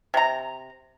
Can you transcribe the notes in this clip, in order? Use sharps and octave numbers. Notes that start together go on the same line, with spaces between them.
C3 A#5